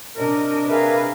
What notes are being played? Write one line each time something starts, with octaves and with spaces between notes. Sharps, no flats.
C3 D4 A#4 D#5
G#4 A#4 B4 E5 F5